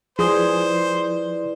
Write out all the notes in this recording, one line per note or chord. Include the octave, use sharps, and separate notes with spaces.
F3 E4 G#4 B4 C5 D5 D#6